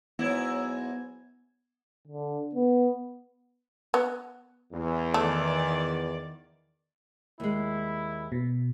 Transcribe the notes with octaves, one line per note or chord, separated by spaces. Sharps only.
G#2 F#3 B3 E4 G#6
D3
B3
B3
E2
D#3 A3 D5
D#2 G#3 E4
B2